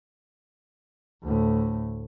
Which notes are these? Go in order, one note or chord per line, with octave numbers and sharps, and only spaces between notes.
D2 A2